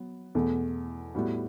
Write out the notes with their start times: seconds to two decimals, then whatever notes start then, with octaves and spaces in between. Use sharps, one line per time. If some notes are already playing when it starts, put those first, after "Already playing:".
Already playing: F#3 B3
0.35 E2 B2 A3
1.15 A2 G3 B3 F#4